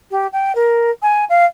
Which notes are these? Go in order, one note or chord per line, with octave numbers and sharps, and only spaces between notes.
G4
G5
A#4
G#5
F5